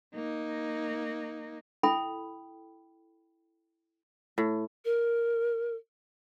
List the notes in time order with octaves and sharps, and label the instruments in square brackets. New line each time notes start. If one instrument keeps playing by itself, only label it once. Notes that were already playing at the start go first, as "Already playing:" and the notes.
[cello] A#3 D#4
[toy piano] E4 A4 G5 B5
[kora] A2
[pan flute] A#4